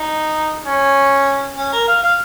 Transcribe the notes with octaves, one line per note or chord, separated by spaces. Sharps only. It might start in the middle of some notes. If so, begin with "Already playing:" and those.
Already playing: D#4
C#4
C#4
A#4
F5
F5